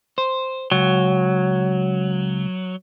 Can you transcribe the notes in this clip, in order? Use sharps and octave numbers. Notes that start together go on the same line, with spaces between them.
C5
C#2 F#3